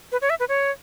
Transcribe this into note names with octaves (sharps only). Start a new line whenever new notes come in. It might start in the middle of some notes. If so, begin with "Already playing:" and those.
B4
C#5
E5
B4
C#5